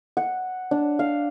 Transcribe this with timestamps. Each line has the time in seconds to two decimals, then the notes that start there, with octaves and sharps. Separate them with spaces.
0.17 F#5
0.71 D4
0.99 F5